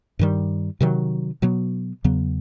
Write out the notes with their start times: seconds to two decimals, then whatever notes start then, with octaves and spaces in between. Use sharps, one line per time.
0.19 G2 D#3 G3
0.81 C3 D#3 F#3
1.42 B2 F#3 B3
2.04 E2 C#3 F#3 B3